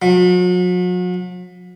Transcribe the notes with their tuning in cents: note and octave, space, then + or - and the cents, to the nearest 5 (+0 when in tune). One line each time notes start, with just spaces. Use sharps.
F#3 -45